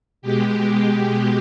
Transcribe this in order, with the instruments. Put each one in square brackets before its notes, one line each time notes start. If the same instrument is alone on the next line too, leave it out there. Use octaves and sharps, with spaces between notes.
[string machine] B2 G#3 G4